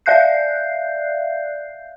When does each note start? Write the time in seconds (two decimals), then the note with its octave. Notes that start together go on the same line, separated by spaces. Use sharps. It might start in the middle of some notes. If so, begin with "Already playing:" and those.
0.06 D5 E5 F5 F#6 G6 C7